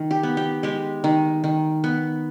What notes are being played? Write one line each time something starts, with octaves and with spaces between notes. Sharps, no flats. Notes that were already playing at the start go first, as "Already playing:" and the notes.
Already playing: D#3
G4
B3
G4
G#3 G4
D#3
D#3
B3